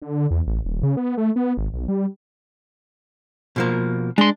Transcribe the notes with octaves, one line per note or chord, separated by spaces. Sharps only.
D3
E2
A1
D#1
C#3
B3
A3
B3
G#1
B1
G3
B2 F3 A#3
G#3 D4 C6